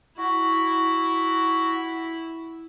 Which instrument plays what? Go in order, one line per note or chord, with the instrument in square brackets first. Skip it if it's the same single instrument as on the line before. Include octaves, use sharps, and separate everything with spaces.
[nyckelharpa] E4 [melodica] F#4